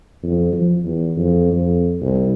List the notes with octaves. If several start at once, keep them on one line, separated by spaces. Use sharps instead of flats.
F2
F3
E2
F2
F2
C2